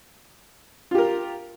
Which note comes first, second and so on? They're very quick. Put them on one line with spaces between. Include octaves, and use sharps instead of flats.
F4 G4 A#4